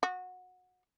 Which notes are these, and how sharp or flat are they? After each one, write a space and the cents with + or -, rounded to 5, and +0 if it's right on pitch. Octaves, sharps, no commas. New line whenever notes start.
F#4 -20